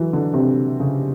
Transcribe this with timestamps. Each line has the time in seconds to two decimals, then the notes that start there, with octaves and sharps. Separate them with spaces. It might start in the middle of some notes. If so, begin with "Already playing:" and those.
Already playing: E3 F#3
0.13 D3
0.34 C3
0.80 C#3